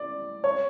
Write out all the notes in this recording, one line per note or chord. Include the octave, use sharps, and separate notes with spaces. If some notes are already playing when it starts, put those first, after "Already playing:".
Already playing: D5
C#5